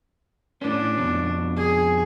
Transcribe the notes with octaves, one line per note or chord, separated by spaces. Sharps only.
A2 C#4 D4
F2 B2
G#4